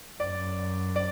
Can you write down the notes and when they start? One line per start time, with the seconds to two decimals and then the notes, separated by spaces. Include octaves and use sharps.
0.20 F#2 D5
0.96 D5